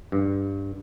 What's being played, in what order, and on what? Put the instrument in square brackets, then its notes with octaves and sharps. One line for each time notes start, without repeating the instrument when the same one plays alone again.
[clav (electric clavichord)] G2